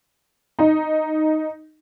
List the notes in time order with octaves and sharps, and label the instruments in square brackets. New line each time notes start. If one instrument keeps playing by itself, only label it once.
[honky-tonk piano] D#4